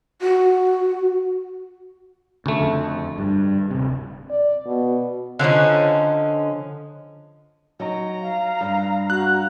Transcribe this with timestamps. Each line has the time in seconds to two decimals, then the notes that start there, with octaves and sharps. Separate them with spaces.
0.21 F#4
2.46 D2 C#3 A3
2.60 F2
3.18 G2
3.71 D1 C3
4.30 D5
4.67 B2
5.39 D3 F3 C#4 D#4
7.80 F#3 D#4 A#5
8.21 F5
8.61 G2
9.10 F#4 F5 A#5 F#6